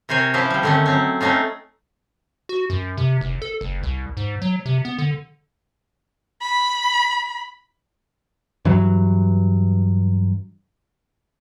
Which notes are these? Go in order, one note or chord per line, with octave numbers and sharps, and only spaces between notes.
C3 A#4 C5 C#5 G#5
F3 C#4 E4 B4 C5
F3 G3
D3 D#3 A3 C4 C#4
F#3 C4 C#4
A3 C4 C#4 D#4 F4
F#4
F#2
C3
F1
A4
F#1
C2
G#2
F#3
C3
B3
D3
B5
G2 E3 F#3